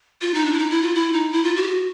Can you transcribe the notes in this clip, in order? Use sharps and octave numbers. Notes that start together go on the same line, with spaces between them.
F4
D#4
D4
E4
D#4
E4
F4
E4
D#4
E4
F4
F#4
G4
F#4